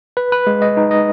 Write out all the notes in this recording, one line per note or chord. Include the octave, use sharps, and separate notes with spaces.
B4
B4
G#3
D#5
D#4
D#5